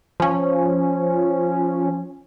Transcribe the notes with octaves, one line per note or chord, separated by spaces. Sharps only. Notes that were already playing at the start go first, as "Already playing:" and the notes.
F3 C#4